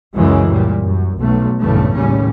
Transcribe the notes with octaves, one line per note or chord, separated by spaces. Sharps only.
C#2 F#2 C#3 E3 G#3
A#2 G3
F#2
B1 A3
A#1 E2 G2 C#3 A3
D#2 A2 C#3 G3 C#4